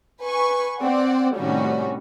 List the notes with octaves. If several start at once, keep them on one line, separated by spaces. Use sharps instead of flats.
B4 G#5 C#6
C4 D5 F#5
A2 C3 D#3 G3 C#4 F#4